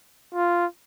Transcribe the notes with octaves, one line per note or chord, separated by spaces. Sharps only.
F4